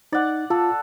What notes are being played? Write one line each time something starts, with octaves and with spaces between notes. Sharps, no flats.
D#4 D5 F#5
F4 A4